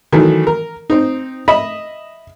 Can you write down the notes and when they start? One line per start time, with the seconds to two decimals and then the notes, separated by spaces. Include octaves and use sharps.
0.12 D#3 E3 F#3 A3
0.47 A#4
0.90 C4 D#4
1.48 D#5 E5 B5